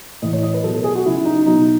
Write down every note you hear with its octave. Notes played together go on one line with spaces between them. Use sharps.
A2 E3 D#5
C#5
D#5
B4
B2 F#3 A4
A4
G#4
F#4
C#3 F#3 E4
D#4
B2 F#3 D#4